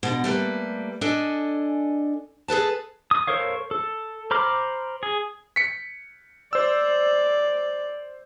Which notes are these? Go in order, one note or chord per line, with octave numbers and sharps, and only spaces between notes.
B2 D3
G3 A3 A#3 B4
D4 A4 D#5 G#5
G#4 A4 B4 A5
D#6
A4 A#4 C5 C#5 F5
A4
C5 A#5 B5 D6 F6
G#4
B6 C#7
C5 D5 E6